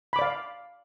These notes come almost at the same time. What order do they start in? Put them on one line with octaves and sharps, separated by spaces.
B5 D6 D5 F5